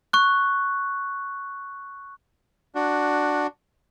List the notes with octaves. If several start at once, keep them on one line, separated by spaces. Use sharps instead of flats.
C#6 F#6
D4 F#4